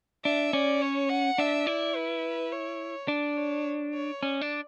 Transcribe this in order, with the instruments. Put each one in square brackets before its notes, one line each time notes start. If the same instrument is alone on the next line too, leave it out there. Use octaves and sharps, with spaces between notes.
[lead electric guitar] D4 [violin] E5
[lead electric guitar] C#4 [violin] D5
[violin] C#5
F#5
[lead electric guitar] D4 [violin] E5
[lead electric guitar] E4 [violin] D5
[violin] B4
C#5
[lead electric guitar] D4 [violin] D5
[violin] C#5
C#5
[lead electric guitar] C#4 [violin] D5
[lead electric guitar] D4